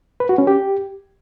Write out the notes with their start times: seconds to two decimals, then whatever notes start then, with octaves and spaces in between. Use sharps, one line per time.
0.20 B4
0.29 F#4
0.38 C#4
0.47 G4